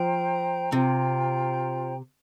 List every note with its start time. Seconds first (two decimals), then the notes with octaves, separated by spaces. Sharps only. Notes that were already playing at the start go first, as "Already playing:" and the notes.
Already playing: F3 C5 G5 A#5
0.72 C3 F4 C5 G5 A#5